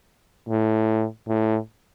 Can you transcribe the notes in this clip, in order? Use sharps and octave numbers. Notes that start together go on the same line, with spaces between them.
A2
A2